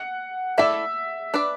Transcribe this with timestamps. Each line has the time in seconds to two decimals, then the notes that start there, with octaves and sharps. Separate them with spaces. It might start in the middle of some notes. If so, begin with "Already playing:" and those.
Already playing: F#5
0.58 A3 E4 A4 D5 E5
1.34 D4 B4 D5